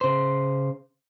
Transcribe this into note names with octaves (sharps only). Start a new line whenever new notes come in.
C#3 C5